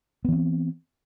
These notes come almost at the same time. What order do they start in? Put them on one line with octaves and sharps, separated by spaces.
B3 E3 C4